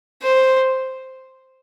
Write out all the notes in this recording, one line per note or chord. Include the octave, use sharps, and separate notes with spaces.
C5